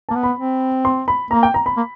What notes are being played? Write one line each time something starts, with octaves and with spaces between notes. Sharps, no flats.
A#3 A5
B3
B5
C4
C6
B5
A#3 A#5
G5
A#5
B5
A#3